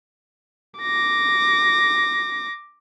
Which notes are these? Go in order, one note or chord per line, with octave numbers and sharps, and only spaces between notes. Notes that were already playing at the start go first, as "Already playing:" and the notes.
D6 A#6